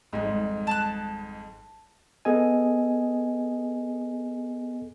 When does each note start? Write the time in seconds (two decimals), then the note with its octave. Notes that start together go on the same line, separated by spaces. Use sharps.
0.13 G#1 F2 G#2 G3 G#3
0.67 A5 F#6
2.25 B3 G#4 A4 D#5 G#5